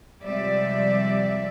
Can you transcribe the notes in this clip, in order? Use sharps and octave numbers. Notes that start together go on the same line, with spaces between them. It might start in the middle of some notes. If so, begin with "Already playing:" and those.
C3 F3 G3 G#3 D5 E5